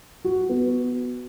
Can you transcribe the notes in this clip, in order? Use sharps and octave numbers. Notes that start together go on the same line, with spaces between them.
F#4
B3